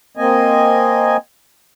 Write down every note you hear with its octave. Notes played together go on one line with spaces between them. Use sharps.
A#3 C4 D#5 G#5